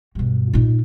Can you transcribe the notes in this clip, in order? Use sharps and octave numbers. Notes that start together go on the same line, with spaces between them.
G2 B2
A#2 D#4